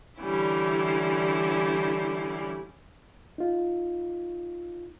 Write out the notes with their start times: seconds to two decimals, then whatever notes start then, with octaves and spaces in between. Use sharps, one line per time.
0.19 D3 E3 G3 C#4 E4
3.38 D#4 F4